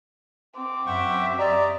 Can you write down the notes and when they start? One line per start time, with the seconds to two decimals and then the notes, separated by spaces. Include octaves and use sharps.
0.57 C4 D6
0.86 F#2 E5 F#5 G5 C#6
1.39 G4 D5 D#5 A#5